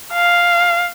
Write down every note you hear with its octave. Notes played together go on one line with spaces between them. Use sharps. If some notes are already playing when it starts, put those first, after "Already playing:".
F5